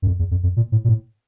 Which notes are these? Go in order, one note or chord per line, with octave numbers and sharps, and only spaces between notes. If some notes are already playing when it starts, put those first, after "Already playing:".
F#2
F2
E2
F2
F2
A#2
A2
A#2
A2